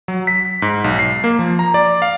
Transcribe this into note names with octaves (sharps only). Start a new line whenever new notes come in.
F#3
B6
G#2
B1
C7
A#3
F3
A#5
D5
F5